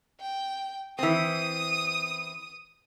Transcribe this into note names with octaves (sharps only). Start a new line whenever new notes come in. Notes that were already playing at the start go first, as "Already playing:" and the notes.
G5
E3 C4 D#6